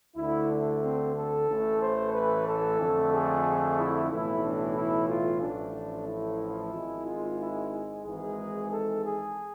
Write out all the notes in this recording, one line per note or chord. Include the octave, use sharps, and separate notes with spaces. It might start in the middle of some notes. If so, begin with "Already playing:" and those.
D2 D3 A3 E4
D4
C4
A4
A1 A2 E3 A3
C5
B4
A4
F2 D3 A3
G#4
E4
B1 A2 E3 E4
D4
E4
F4
A1 A2 F3 A3 D4
E4
G#1 G#2 G#3
F4
E4
G#1 G#2 E3 G#3 G#4
A4
G#4